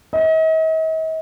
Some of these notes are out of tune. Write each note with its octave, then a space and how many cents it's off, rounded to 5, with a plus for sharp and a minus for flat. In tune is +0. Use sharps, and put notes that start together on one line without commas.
D#5 +45